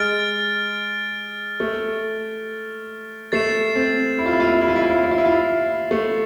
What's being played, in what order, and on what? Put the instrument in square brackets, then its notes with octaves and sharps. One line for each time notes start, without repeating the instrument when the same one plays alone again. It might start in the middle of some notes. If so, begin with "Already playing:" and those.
Already playing: [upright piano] G#3 [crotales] F6 A6 D7
[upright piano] A3
[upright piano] A3 [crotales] A6 C7 E7
[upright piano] C4
E4
F4
E4
F4
E4
F4
E4
F4
E4
F4
E4
F4
E4
F4
E4
F4
E4
A3